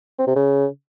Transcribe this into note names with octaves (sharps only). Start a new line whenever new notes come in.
C4
C3
C#3